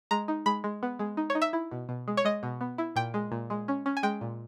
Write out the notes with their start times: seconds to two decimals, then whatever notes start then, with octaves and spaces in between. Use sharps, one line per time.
0.11 G#3 A#5
0.28 D#4
0.46 G#3 B5
0.64 G#3
0.83 B3
0.99 G#3
1.17 D#4
1.30 C#5
1.35 D#4
1.42 E5
1.53 E4
1.71 B2
1.89 B2
2.08 G#3
2.17 C#5
2.25 G#3 D#5
2.43 B2
2.61 B3
2.78 E4
2.96 A#2 G5
3.14 G#3
3.32 A#2
3.50 G#3
3.68 C#4
3.86 C#4
3.97 G#5
4.03 G#3 G5
4.21 A#2